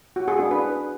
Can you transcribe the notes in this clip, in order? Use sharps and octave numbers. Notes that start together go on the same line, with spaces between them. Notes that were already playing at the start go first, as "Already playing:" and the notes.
F#4
G#4
D4
B4